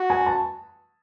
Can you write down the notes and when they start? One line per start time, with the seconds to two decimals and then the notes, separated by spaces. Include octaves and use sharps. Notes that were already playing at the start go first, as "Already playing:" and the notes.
Already playing: F#4
0.10 G#5
0.26 A5